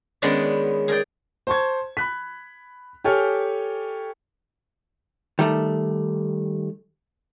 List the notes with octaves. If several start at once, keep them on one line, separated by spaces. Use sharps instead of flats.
D#3 G#3 B3 C#4 D4 D5
G#4 A#4 D5 G5
C5 A5 C#6 G#6
B5 F#6 B6
G4 A4 C#5 G#5 F6
D#3 G3 A3